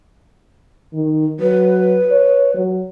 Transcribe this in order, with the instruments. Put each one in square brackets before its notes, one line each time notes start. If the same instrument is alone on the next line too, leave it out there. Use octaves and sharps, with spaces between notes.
[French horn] D#3
[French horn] F#3 [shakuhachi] B4
[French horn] C#5
F#3